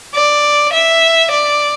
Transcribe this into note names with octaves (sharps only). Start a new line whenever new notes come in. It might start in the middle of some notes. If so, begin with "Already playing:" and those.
D5
E5
D5